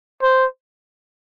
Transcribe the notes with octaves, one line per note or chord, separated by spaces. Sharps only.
C5